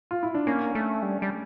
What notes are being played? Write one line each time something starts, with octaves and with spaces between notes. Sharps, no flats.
F4
E4
D4
A#3 C#4
A3
G3
G3